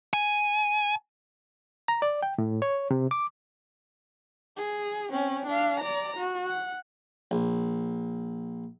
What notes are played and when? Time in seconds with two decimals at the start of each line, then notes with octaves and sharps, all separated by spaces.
0.13 G#5
1.88 A#5
2.02 D5
2.23 G5
2.38 A2
2.62 C#5
2.91 C3
3.11 D6
4.57 G#4
5.10 C4 C#4
5.47 D4 F5
5.80 D5 A#5
6.17 F#4
6.47 F#5
7.31 A#1